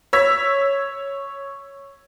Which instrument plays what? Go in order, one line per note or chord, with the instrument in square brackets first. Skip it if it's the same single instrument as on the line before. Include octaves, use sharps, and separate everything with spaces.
[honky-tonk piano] C#5 E6 G#6 B6